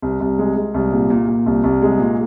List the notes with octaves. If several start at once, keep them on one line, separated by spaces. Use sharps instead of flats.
C2
C2
G#3
G#3
C2
A#2
A#2
A#2
C2
C2
G#3
A#2